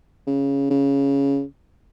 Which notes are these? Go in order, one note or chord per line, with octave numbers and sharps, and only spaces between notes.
C#3
C#3